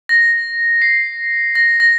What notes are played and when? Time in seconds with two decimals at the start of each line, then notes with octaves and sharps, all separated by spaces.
0.09 A#6
0.82 C7
1.55 A#6
1.80 A#6